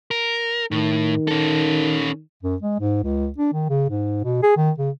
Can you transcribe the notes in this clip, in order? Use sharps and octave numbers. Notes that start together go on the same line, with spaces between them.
A#4
A2 D#3
C#4 A4
F#2
G#3
G#2
C#2
D4
D#3
C#3
G#2
B2
G#4
D#3
C#3